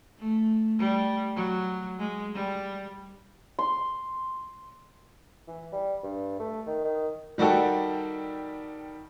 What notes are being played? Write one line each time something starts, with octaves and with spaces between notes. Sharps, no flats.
A3
G3
F#3
G#3
G3
C6
E3
G3
G2
A3
D#3
D#3
D#3 G3 F#4 G4 A4